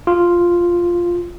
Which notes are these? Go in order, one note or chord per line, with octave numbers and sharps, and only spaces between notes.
F4